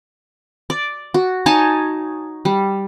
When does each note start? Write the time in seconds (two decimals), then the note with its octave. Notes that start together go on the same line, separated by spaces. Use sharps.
0.70 D5
1.14 F#4
1.46 D#4 C#5 G#5 A5
2.45 G3